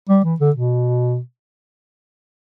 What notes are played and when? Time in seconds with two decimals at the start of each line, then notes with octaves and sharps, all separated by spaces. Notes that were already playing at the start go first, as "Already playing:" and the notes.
0.09 G3
0.24 E3
0.40 D3
0.55 B2